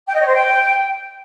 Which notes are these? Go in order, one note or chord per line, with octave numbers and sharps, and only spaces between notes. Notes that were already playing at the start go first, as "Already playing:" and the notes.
G5
D#5
C#5
C5
G5